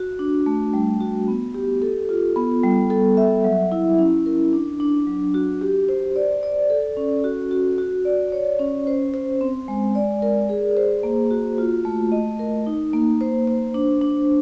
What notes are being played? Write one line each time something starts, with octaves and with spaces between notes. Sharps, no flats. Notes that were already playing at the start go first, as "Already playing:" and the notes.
Already playing: F#4
D4
A3
G3
F#4
B3
G4
A4
F4
B3
G3
A4
E5
F#3
E4
C#4
A#4
D4
D4
F#3
F#4
G4
C5
D5
D5
A4
C#4
F#4
F#4
F#4
D5
C#5
C#4
C5
C5
C4
G#3
D5
A#4
G#4
C5
A#3
F#4
F4
A3
D#5
A#4
D#4
A#3
C5
C5
D4
D4